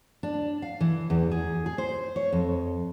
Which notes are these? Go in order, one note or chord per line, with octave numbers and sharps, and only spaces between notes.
D4
F5
E3
E2
G#4
G#4
C5
C#5
F2